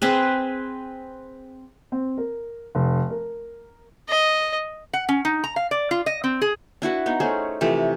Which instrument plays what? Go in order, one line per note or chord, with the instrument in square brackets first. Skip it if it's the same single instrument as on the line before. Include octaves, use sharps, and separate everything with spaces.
[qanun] C4 G#4 B4
[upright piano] C4
A#4
F1
A#4
[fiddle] D#5
[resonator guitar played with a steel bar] F#5
C#4
D#4
A#5
F5
D5
F4
D#5
C4
G#4
[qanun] D4 E4 F#4 B4
B3 D#4
A3 C#4 G#4 C5
C3 E3 F3 A3